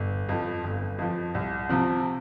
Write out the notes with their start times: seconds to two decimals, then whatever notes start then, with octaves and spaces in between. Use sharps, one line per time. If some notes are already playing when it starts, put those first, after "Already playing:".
Already playing: G1
0.29 F2 F3
0.64 G1
0.99 F2 F3
1.35 C2
1.69 C3 F3 C4